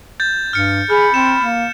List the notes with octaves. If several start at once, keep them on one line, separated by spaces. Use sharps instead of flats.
G6 A6
G2 F6 C#7
G#4 B5 F6
C4 E7
A#3